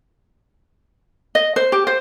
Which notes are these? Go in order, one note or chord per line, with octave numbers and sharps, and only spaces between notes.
D#5
C5
G4
C5